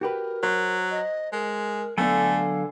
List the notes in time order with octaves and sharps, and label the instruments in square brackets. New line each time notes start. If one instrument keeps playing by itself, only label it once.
[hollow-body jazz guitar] F#4 G4 B4 [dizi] A#4
[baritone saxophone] F#3 [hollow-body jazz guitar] C5
[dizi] D#5
[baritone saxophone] G#3 [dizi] A#4
[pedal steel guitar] D3 A4 G#5 [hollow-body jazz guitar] F#3 B3 D4 [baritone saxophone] A3 [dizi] F5